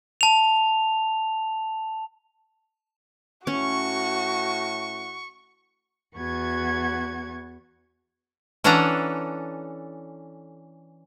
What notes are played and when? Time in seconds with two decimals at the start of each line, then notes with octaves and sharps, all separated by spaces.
0.21 A5 F7
3.47 A2 C#4 F#4 C#6
6.16 E2 B3 F#4 C#6 G#6
8.64 E3 C#4 D4 A4 F#5 A#5